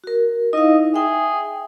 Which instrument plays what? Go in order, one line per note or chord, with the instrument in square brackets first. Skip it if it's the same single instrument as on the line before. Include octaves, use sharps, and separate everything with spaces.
[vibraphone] F#4 A#4
[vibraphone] D#4 E4 F5 [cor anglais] D#5
[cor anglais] G#4 [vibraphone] E5 G5